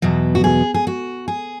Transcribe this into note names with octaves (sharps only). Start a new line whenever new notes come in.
E2 B2 F#3 B3
F#4
G#4
G#4
F#4
G#4